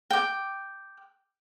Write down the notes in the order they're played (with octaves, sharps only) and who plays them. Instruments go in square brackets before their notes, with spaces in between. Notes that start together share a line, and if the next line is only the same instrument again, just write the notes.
[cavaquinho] G5 D6